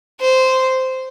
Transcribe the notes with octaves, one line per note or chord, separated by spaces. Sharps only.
C5